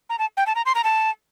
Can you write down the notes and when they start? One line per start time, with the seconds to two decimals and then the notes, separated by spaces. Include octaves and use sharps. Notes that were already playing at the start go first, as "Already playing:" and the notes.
0.09 A#5
0.19 A5
0.37 G5
0.46 A5
0.55 A#5
0.66 C6
0.75 A#5
0.84 A5